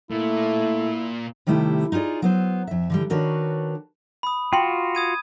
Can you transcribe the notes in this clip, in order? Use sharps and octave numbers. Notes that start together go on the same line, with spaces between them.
A#2 A3 E4
C3 D#3 G3 A3 E4
D#4 F4 G4 G#4 D5
F#3 B3 C5
F2 E5
D3 E3 G3
D#3 D4 F#4 A#4 B4 C#5
B5 D#6
F4 F#4 G5 C6
D#6 G#6 D#7